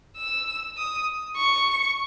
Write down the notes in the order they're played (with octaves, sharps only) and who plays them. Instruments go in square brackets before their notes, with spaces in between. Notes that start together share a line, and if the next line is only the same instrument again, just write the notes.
[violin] E6
D#6
C#6